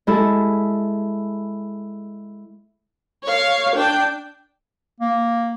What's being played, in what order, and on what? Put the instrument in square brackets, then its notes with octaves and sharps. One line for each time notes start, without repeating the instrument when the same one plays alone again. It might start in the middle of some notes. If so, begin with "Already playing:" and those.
[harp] G#3 E4 A4
[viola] C#5 F5
D4 G5
[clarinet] A#3